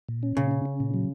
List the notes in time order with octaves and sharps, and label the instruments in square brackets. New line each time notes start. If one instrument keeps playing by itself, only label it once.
[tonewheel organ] A#2
C#4
[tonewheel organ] A#2 [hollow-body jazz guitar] C#3
[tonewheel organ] C#4
C#4
A#2
F#3